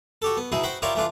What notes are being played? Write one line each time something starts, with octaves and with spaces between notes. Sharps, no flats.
F#4 G4 A4
B3
B2 D#4 E4 G#4
F#4 C5 G5 B5
E4 F4 G4 A#4 C#5 D5
E3 A3 D4 F4